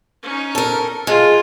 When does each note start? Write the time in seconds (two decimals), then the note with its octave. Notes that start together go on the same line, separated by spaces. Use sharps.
0.23 C#4 D#4
0.55 A4 A#4
1.07 G#3 F4